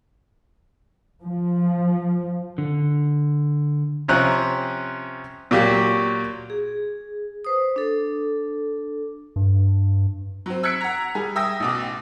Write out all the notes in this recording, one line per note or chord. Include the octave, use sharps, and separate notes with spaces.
F3
D3
C3 F3 C4 C#4 A#5 F#6
A#2 F#3 A#3 F#4 G4
G#4
B4 C5 D#6
D4 A4
G2
F#3 C4
E6 F#6 G#6 B6 C#7 D7
F#5 A#5
G3 G#4
E5 G5 D#6 E6 A#6
A1 B2 D6